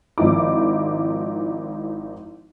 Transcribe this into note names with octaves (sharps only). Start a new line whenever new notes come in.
G#1 F3 D#4 E4 D6